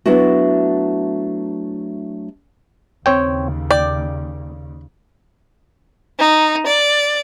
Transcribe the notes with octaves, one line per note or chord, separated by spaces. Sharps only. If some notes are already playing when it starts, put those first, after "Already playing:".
F#3 A3 B3 D4 E4 F#4
D#2 C#3 C4 C#5 G5
D5 G5
D#4
D5